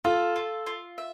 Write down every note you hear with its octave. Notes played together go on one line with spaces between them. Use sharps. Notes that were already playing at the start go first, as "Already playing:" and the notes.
F4 A4
F4
F4
E5